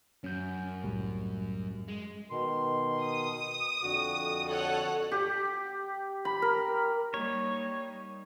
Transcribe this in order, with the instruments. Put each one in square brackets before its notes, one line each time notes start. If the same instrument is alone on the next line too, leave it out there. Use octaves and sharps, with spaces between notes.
[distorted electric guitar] F#2 [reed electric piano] C#4 G6
[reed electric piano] C2 A2 G3
[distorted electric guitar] G#3
[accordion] B2 D#3 C6
[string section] D#6
[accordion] F2 D3 F#4
[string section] A4 C#5 F#5
[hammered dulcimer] G4
B5
A#4
[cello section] G3 A#3 D#4 [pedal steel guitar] C#5